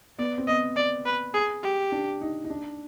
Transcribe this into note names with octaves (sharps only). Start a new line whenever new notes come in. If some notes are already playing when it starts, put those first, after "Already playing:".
B3 D5
C4
B3 D#5
D5
B4
G#4
G4
D4
D#4
D#4
D4